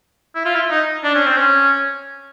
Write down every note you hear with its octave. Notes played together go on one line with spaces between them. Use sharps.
E4
F4
E4
D#4
D4
C#4
C4
C#4